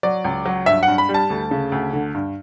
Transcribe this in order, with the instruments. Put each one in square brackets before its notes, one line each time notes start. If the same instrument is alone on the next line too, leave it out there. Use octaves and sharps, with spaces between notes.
[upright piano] F#3 D5
C#2
F#3
G2 E5
F#5
G2
B5
G3
A5
D2
C#3
D2
D3
G2